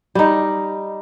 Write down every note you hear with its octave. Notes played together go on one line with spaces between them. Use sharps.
G3 D#4